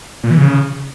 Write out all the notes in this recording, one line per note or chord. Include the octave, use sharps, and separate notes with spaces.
A#2
E3
C#3